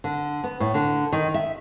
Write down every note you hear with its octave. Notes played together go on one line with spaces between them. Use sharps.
D3
B3
A2
D3
D#3
E5